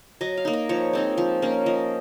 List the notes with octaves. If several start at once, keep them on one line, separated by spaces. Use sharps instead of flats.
F#3 D#5
F5
A#3 D#4
D#5
F3 C#5
G#3 C4 D#4
F3
A#3 C#4
F3 D#5